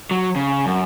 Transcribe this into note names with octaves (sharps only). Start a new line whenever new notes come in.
F#3
C#3
F#2